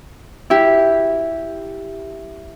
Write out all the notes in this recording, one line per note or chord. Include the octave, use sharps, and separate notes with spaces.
E4 G4